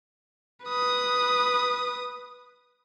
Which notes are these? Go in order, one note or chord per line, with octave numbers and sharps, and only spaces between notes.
B4 D#6